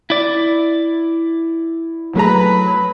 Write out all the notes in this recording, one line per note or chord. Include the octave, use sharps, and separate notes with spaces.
E4 D5
F#3 A3 G#4 B4 A#5